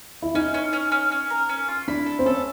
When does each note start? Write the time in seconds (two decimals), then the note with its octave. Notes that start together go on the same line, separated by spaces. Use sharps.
0.22 E4
0.35 C#4 D#4
0.54 C#4
0.73 C#4
0.92 C#4
1.12 C#4
1.30 A#4
1.49 C#4
1.68 F4
1.88 D4 E4
2.06 A4
2.19 C4
2.26 C#4 A4